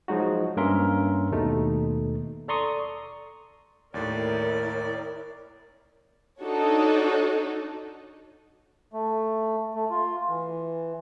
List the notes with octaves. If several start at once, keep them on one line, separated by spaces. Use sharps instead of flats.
F3 F#3 G#3 D#4 F#4
G2 A#3 C#4 A#4 E5 C6
D#2 B2 A3 D#4
A4 D5 A#5 C6 C#6 D#6
D#2 A2 E4 A#4 C#5 D5
D4 D#4 F#4 A4 C#5
A3
A3
F4
E3